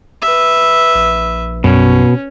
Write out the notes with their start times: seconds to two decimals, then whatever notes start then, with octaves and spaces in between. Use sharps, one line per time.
0.22 B4 E5
0.95 A#1
1.64 F#2 B2 C#4